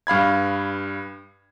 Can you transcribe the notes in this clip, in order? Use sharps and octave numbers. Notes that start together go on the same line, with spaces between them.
G2 F5 B5 G#6